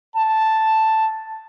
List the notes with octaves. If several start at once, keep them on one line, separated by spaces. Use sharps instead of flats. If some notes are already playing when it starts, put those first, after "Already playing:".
A5